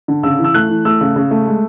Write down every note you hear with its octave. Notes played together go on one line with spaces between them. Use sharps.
D3
C#3 E6
E3
E6
A3 F#6
E3
A3 E6
C#3
C#3
A3
G#3